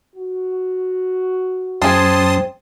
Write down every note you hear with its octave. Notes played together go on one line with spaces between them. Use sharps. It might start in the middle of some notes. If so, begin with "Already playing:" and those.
F#4
F#2 F#3 C4 C#4 G#4 A5 C6 D#6